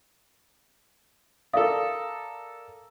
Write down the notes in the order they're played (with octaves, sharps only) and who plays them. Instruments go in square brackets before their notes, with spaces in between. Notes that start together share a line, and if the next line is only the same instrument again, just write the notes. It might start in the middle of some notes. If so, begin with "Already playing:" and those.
[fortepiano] A4 A#4 D5 [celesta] E5 F5 D#6